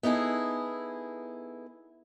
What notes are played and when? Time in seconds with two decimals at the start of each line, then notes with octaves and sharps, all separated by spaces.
0.03 B3 D#4 E4 G#4 A4